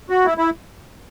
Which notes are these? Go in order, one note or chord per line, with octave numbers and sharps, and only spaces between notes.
F#4
E4
E4